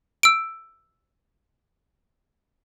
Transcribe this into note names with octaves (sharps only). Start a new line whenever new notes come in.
E6 D7